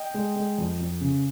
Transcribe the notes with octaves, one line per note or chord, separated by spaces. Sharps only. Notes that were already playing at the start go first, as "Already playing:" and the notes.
Already playing: D#5 G5
G#3
G#3
F2
F2
C#3